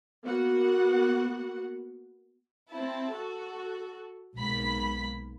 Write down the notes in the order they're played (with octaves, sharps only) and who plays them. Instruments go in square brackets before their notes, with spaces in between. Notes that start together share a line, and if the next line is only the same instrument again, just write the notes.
[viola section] A#3 B3 F#4 F#5
[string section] C4 E4 A5
F#4 A4
B1 G#2 A#3 B5 B6